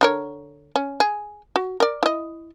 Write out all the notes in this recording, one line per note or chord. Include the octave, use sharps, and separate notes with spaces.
D3 A#4 C#5
C#4
G#4
F#4
A#4 D5
E4 D#5